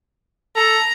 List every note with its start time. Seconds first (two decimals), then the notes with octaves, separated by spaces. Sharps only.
0.56 A4 A#5